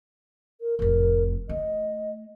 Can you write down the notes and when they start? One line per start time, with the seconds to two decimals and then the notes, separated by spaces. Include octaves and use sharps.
0.61 A#4
0.79 F1 A2 A#4
1.49 A3 D#5